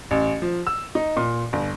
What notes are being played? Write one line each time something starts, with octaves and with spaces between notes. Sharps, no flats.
A1
F3
E6
D#4
A#2
G1